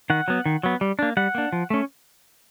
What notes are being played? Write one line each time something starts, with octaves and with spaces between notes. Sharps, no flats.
D#3 F#5
F#3 B3
D#3
F#3 B3
G3
A#3 D4
G3 F#5
A#3 D4
F3
A3 C#4